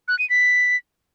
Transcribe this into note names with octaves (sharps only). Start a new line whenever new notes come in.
F#6
D#7
B6